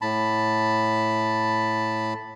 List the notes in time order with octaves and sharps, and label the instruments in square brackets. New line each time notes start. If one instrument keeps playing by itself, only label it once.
[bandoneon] A2 A5 B5